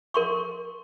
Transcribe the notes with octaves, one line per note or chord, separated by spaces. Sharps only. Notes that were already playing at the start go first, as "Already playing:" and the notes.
A#4 C6 C#6